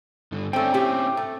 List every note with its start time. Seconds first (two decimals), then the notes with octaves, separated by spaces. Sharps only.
0.32 G2 D3
0.53 D3 A3 C4 C#4 G5
0.74 A2 G4
1.17 A3